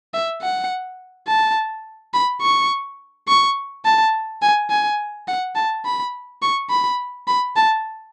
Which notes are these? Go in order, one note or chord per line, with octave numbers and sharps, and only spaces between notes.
E5
F#5
A5
B5
C#6
C#6
A5
G#5
G#5
F#5
A5
B5
C#6
B5
B5
A5